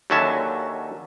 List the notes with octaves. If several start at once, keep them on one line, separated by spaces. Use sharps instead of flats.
D#2 D3 F#3 C#4 E5 A5